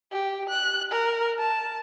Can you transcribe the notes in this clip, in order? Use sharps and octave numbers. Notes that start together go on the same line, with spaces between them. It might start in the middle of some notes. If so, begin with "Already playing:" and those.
G4
F#6
A#4
A5